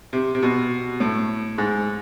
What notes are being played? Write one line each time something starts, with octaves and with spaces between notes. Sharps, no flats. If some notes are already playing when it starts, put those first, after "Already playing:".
C3
C3
B2
A2
G#2